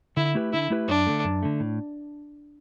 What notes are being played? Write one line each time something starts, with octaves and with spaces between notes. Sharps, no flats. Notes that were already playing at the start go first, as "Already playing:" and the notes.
D3 E4
A3 E4 G4 B4
D3 E4
A3 E4 G4 B4
F#2 D4
D3 A3
F#2
D3 A3
A2